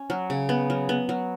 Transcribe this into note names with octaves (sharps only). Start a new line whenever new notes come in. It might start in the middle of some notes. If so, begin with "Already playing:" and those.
Already playing: C#4
F#3
C#3
B3
F#3
B3
F#3